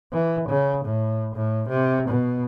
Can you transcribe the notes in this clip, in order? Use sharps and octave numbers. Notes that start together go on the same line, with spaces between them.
E3
C#3
A2
A2
C3
B2